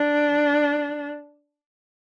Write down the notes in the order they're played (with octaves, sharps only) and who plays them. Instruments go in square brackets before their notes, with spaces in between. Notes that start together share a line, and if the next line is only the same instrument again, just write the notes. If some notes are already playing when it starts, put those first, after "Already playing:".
Already playing: [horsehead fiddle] D4